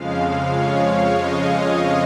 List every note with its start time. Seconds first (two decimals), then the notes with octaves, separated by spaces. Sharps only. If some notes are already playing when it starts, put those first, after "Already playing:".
Already playing: F2 C#3 F3 G#3 F5
0.21 F5
0.51 C#5
0.82 C#5
1.12 D#5
1.42 D#5